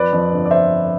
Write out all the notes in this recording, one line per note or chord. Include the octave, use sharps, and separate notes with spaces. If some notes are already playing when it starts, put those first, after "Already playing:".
Already playing: F2 B4 D5
F2
G1
D5
C5 E5